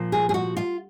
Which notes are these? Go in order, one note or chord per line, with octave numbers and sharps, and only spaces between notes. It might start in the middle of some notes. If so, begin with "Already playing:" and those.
Already playing: A#2 F3
G#4
G#4
F#4
F4